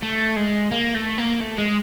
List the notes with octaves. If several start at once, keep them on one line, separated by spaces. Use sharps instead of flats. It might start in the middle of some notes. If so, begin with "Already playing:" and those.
A3
G#3
A#3
A3
A#3
A3
G#3